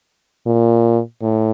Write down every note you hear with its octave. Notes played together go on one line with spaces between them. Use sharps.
A#2
A2